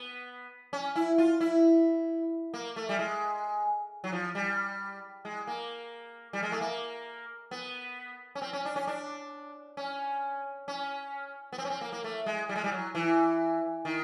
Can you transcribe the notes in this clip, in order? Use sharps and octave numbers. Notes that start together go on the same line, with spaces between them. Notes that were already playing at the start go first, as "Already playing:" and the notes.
Already playing: B3
C#4
E4
F4
E4
A#3
A3
G3
G#3
F#3
F3
G3
G#3
A#3
G3
G#3
A3
A#3
B3
C#4
C4
C#4
D4
C#4
D4
C#4
C#4
B3
C4
C#4
C4
A#3
A#3
A3
G#3
G3
G#3
G3
F#3
E3
D#3